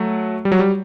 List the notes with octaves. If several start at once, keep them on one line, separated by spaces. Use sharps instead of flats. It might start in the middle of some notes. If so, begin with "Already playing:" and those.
Already playing: F#3 A3
G3
F#3
G3